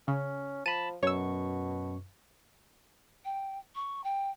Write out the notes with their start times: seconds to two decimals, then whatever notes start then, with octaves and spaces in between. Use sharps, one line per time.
0.08 C#3 C#4
0.66 F3 A5 B5 D#7
1.03 F#2 B2 C#5 C#6 E6
3.25 G5
3.75 C#6
4.04 G5